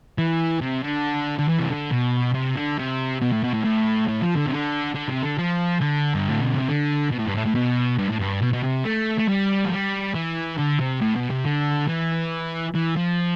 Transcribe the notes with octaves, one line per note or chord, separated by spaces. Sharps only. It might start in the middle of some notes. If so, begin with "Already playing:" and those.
E3
C3
D3
D3
E3
C3
D3
B2
C3
D3
C3
B2
A2
B2
A2
A2
A2
F3
D3
C3
D3
D3
C3
D3
F3
D3
G2
A2
B2
C3
D3
B2
A2
G2
A2
A2
B2
G2
A2
G2
B2
B2
C3
A3
A3
G3
F3
G3
E3
D3
C3
A2
B2
C3
D3
E3
E3
F3